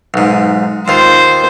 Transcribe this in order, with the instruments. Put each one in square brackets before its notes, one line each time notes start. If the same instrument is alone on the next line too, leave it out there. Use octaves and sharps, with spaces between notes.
[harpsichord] B1 G#2
[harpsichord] D#2 F4 [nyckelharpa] C5